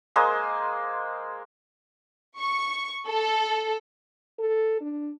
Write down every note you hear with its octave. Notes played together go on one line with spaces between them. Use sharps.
G#3 A#3 C5 D#6
C#6
A4
A4
D4